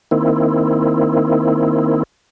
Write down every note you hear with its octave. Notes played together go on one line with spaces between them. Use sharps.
D#3 A#3 C4 E4